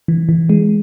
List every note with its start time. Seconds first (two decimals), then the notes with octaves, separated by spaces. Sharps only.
0.08 E3
0.29 E3
0.49 G#3